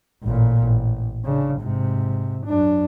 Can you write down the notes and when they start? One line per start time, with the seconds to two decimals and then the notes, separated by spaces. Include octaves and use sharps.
0.24 A1 A#2
0.63 A1
1.25 C#3 D4
1.60 G#2 C3
2.46 F#2 D4